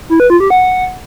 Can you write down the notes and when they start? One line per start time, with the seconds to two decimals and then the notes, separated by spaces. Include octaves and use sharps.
0.10 E4
0.20 B4
0.30 F4
0.40 G4
0.50 F#5